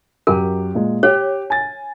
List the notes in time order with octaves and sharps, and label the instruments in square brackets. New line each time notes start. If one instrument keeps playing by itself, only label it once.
[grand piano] F#2 G4 [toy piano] A#4
[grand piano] A#2 G#3
[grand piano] G4 [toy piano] C#5
[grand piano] G#5 A6